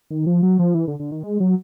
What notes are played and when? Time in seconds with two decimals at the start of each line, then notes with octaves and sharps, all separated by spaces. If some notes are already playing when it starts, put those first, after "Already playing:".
0.11 D#3
0.26 F3
0.43 F#3
0.59 F3
0.74 E3
0.88 D3
0.99 D3
1.12 D#3
1.23 G#3
1.40 F#3